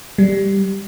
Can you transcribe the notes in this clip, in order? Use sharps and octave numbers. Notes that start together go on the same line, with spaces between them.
G3